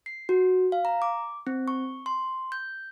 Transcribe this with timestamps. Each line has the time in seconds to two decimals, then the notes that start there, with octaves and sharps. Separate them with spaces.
0.06 C7
0.29 F#4
0.72 F5
0.85 A#5
1.02 D6
1.47 C4
1.68 C#6
2.06 C6
2.52 G6